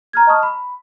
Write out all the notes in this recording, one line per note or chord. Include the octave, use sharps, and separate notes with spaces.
A#5 F6 G#6
D#5 A5 C#6 D#6 F6
B5